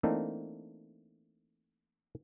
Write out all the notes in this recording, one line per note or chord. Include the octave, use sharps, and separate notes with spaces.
E3 A3 A#3 C4 D4 D#4